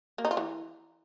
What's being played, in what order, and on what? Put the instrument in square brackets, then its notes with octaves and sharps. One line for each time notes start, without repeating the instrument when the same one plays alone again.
[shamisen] A#3
D#4
F4
E3